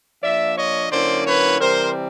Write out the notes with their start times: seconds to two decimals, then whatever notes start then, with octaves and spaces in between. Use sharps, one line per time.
0.23 F3 A#3 D4 D5 E5
0.56 C#5 D#5
0.91 D3 F#3 A#3 C#4 E4 C5 D5
1.25 B4 C#5
1.59 C3 E3 G3 C4 A#4 C5